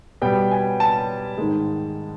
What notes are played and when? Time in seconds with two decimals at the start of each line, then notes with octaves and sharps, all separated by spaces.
0.22 B2 G3 B3 G5
0.51 G#5
0.80 A5
1.38 G#2 D#3 G#3